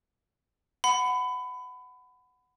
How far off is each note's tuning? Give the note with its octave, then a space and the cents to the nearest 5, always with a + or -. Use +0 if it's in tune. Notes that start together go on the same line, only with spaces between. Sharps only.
F#5 +0 B5 +25